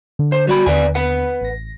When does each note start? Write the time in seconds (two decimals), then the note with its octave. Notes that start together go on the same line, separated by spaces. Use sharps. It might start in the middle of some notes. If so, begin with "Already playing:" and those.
0.19 D3
0.32 C5
0.47 G3 F#4 B5
0.66 D#2 D3 B4 D5 G#5
0.95 B4 F#5
1.41 A1 A#6